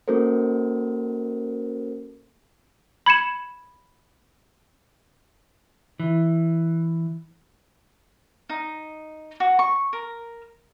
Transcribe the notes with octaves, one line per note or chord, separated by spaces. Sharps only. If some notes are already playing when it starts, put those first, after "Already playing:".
A#3 C#4 F#4 A4 A#4 C5
B5 G#6 C#7 E7
E3
D#4
F#4
C#6
A#4